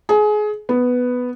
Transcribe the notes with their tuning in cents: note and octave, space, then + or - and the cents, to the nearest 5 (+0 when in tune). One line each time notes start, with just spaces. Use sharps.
G#4 +25
B3 +5